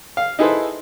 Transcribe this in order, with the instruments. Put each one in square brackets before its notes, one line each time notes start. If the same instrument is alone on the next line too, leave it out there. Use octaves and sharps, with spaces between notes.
[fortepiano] F5
D#4 E4 G#4 A4 B4 C5